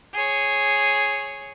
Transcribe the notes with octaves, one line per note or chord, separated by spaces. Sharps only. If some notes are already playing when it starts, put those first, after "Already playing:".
G#4 C#5